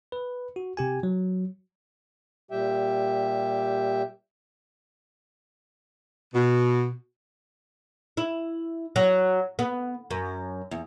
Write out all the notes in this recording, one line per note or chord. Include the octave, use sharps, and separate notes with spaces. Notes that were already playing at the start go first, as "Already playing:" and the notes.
B4
F#4
C3 G4 G#5
F#3
A#2 G3 G4 E5 G5
B2
E4
F#3
B3
F#2
E2